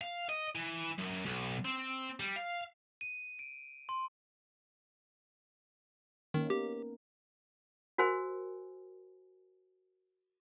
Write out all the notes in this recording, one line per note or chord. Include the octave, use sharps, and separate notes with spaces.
F5
D#5
E3
F#2
B1
C4
G3
F5
D#7
D7
C6
D#3 A#3 C#4 D#4
B3 C#4 G4 A#4
F#4 A#4 C5 G#5